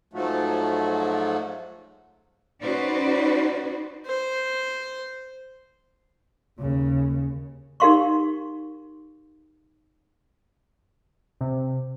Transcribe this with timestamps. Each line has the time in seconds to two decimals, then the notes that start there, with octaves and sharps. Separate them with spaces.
0.13 G#2 F3 F#3 A3
2.63 C#4 D#4 F#4 B4 C5 D5
4.06 C5
6.60 D#2 C#3
7.80 D#4 G4 A#4 F5 C6 C#6
11.41 C3